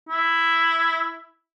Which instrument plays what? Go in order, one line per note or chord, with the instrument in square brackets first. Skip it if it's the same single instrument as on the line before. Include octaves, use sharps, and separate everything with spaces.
[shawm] E4